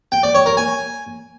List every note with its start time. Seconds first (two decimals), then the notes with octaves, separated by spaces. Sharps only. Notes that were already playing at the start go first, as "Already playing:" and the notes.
0.12 G5
0.23 D5
0.35 C#5
0.46 A#4
0.57 G#5